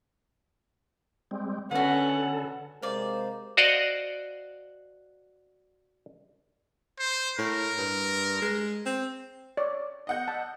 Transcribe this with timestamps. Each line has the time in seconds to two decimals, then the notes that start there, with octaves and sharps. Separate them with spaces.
1.31 G3 G#3 C4
1.71 D3 C#4 F#4 A4 B4 F#5
2.82 C3 G#3 A#4 C5 D5 F5
3.57 F#4 C5 D5 D#5 F5 F#5
6.99 C5
7.38 A2 A#4
7.78 G2
8.42 G#3
8.86 C4
9.57 C#5 D5
10.07 D#5 F#5 G6
10.28 A5